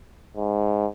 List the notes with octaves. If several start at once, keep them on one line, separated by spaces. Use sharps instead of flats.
G#2